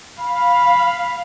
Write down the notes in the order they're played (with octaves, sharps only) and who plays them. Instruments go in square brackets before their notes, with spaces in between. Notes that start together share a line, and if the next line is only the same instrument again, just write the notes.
[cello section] F5 [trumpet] B5